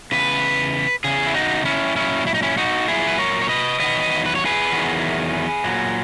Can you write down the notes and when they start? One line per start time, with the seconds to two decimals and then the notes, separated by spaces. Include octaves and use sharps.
0.12 E2 C#3 B4
1.04 E2 C#3 G#4
1.27 E4
1.34 D#4 F#4
1.65 C#4 E4
1.95 A#2 F#3 C#4 E4
2.27 E4
2.34 D#4
2.42 C#4 E4
2.57 D#4 F#4
2.88 A#2 F#3 E4 G#4
3.07 B4
3.18 A#4 C#5
3.42 C#5
3.49 B4 D#5
3.80 E2 D#3 F#3 B4 D#5
4.26 B4
4.36 C#5
4.45 G#4 B4
4.72 E2 D#3 F#3
5.64 A#2 F#3